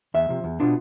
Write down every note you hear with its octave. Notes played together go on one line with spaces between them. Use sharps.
E2 E5
C3 F3
E2
B2 B3 D4 F4